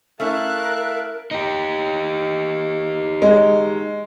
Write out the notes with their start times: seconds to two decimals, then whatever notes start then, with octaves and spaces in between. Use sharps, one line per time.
0.20 A3 C#4 E4 A#4 E5 F5 A5 F#6
1.31 D#4 G4
3.22 G#3